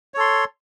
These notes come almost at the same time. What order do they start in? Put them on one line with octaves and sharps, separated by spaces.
C#5 A4 C6